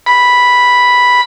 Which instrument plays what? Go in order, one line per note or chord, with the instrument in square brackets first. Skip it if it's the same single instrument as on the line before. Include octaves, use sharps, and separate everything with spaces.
[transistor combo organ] B5